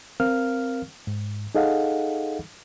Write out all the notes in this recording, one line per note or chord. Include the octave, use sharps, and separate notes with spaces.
C4 A#4 F5 F6
G#2
D#4 G#4 A4 D#5 F5 F#5